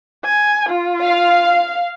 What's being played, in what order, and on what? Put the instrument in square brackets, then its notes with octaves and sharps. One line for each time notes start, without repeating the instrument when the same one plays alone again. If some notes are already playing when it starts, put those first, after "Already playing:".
[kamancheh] G#5
F4
[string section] F5